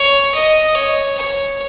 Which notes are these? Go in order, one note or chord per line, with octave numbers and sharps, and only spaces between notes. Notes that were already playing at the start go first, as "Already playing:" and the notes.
Already playing: C#5
D#5
C#5
C#5